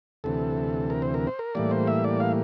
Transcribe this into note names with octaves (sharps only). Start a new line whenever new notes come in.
D2 C3 E3 A4
A#4
C5
A#4
C5
A#4
A2 E3 G3 A#3 D5
C5
E5
D5
F5